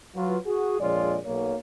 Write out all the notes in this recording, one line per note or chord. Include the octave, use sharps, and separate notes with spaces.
F#3 F4 B4
F#4 G#4
A#1 F2 G#3 F4 C#5 D5
B1 A#3 C#5